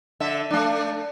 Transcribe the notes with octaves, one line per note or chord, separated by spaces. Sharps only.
D3 E5
A3 D4